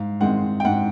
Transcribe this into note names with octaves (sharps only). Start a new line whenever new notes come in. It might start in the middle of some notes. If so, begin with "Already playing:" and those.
Already playing: G#2 F5
D#3 G#3 C4 F#5
G5
G#2 F#5